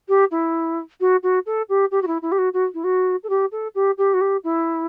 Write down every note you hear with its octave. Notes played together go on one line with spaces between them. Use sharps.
G4
E4
F#4
F#4
A4
G4
G4
F#4
E4
E4
G4
F#4
F#4
E4
F#4
A4
G4
A4
G4
G4
F#4
G4
E4